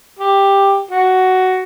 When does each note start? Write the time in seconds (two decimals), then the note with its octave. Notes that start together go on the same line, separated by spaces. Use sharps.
0.19 G4
0.91 F#4